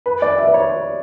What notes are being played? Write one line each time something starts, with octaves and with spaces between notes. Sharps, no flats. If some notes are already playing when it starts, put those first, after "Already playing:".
B4
D5
E5
B4
C#5